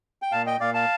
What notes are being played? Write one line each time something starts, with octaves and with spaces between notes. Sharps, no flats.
G5
A#2 F5 A5
D#5 G5
A#2 D5 F5
F5 A5